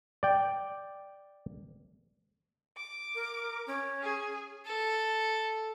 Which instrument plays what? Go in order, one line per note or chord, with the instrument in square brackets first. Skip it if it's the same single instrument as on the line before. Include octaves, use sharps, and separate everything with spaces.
[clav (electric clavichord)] D5 G5
[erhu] D6
[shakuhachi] A#4
C#4
[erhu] G#4
[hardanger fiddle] A4